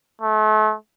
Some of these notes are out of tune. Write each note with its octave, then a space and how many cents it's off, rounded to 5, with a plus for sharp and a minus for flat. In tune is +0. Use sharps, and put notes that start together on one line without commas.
A3 -35